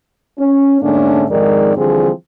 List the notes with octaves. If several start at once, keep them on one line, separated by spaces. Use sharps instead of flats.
C#4
G#2 D3 A3 A#3 C#4 D4
F2 G#2 D#3 G#3 A#4 D5
D3 E3 F3 G3 C4 G#4